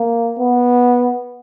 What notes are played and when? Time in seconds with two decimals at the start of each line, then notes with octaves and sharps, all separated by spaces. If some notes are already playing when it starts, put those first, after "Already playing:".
Already playing: A#3
0.39 B3